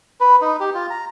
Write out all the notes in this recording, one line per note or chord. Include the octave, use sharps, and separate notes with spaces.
B4
D#4
G4
F4
A#5